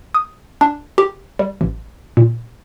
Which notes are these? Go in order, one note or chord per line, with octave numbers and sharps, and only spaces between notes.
D#6
D4
G4
G3
A1
A#2